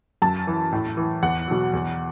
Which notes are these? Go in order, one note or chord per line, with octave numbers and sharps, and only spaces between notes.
F#2 A5
E3
A2
E3
E2 F#5
B2 F#3
E2